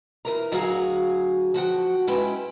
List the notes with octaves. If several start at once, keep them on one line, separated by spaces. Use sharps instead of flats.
E3 A#4 A#5
D2 F#3 F#4 G#4 F5
F3 F#4 F#5 G5
G#3 C#4 E4 B4 G5